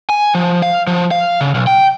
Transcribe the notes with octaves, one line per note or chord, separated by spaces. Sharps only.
G#5
F3
F5
F3
F5
C#3
B1
G5